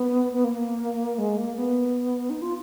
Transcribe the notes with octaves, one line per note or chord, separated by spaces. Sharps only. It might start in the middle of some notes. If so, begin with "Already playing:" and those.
Already playing: B3
B3
A#3
G#3
A#3
B3
D#4
F4